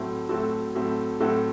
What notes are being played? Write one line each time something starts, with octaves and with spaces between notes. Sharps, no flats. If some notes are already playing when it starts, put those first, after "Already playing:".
Already playing: A2 F#3 A3 C4
A2 F#3 A3 C4 F#4 A4
A2 F#3 A3 C4
A2 F#3 A3 C4 F#4 A4